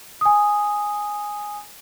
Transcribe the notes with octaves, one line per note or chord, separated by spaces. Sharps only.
G#5 D#6